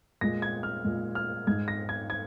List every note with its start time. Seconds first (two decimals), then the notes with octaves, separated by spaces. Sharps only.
0.21 A#2 G#3 A#6
0.42 G#6
0.63 F6
0.84 A#2 G#3
1.15 F6
1.47 G#2 G#3 G#6
1.68 A#6
1.89 G#6
2.10 G#6